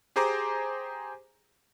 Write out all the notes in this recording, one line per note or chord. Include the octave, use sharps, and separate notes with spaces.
G4 G#4 C5 G#5 A#5 D6